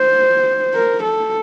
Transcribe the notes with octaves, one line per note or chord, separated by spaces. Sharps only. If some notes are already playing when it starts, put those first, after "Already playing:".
Already playing: C5
A#4
A4